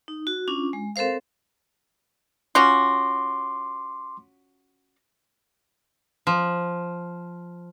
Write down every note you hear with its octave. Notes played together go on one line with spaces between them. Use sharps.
D#4
F#4
C#4 D4 F4
G#3
C4 A4 A#4 C5 F5
C#4 F4 F#4 C6 D6
F3